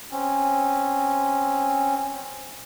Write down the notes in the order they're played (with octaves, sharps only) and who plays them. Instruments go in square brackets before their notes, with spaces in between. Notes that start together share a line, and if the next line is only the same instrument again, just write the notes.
[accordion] C4 C#4